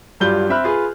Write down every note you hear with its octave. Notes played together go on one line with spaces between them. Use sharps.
G2 F#3 G3 F4 G6 G7
C4 E5 B5 F6 F#6
F4 G#4 B4